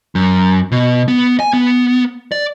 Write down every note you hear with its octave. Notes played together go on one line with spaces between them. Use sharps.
F#2
B2
B3
G#5
B3
D5